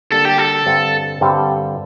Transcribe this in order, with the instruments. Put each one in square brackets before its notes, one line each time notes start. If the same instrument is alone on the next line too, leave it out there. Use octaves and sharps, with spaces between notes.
[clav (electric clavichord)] D3 G3 A#3 D4 [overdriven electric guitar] A4
[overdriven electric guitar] G4
A4
[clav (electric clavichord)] G2 D3 G3 C4
G2 D3 G3 C4